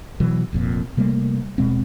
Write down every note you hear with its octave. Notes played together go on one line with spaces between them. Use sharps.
B2 E3 F#3
F1 F2 A#2
C3 G3 A3 A#3
D#1 B2 G#3 C4